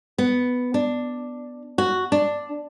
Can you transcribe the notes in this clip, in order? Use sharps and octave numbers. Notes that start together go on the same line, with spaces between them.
B3
D4
F#4
D4